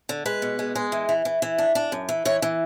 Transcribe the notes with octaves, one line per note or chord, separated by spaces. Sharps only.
D3
G#3 B4
B2
G#3
G#3
E3
E3
E3
E3
D4
D4
F#2
E3
E3 C#5
E3